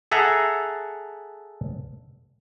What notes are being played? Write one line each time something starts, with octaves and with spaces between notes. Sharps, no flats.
G#4 A4 E5 F#5 A#5